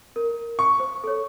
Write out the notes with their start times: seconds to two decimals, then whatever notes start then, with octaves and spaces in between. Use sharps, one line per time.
0.16 A#4
0.59 C#6
0.80 C5
1.04 A4 C#5